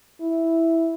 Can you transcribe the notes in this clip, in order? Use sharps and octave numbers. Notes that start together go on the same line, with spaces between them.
E4